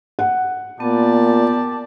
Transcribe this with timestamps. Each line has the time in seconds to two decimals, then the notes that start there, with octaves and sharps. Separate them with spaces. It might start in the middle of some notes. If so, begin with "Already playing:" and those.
0.19 F#5
0.80 A#2 B3 G4 D5 A5